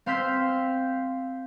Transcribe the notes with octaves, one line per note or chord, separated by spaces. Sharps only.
C4 F5 C6 E6 G6 B6